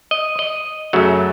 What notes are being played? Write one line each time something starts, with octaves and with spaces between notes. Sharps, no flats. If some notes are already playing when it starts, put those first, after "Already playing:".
D#5
D#5
F#2 C#3 F#3 A3